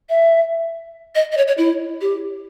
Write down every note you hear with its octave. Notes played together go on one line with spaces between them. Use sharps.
E5
D#5
D#5
C#5
C#5
E4
G4